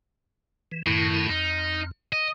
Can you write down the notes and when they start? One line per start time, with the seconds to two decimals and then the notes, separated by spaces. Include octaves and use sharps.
0.72 E3
0.86 F#2 A2 D#3 E4
1.29 F2 D#4
2.13 D#5